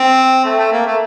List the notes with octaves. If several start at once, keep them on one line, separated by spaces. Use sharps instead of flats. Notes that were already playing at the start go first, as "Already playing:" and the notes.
Already playing: C4
A3
A3
A#3
A3